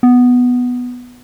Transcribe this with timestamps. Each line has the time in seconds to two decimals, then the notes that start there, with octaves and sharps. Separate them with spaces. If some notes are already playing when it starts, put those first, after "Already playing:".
0.03 B3